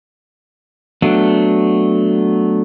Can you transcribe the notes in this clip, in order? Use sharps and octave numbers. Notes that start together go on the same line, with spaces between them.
F#3 A3 B3 D4